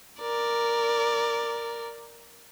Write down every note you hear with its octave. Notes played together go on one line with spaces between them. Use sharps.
A#4 D5